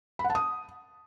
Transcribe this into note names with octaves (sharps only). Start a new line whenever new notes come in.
B5
F#5
A5
D#6